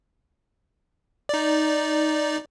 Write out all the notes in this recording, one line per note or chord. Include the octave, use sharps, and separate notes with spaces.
D#4 D5